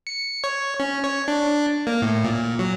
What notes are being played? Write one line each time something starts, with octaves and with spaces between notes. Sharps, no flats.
C#7
C#5
C#4
C#5
D4
A#3
A2
A#2
F#3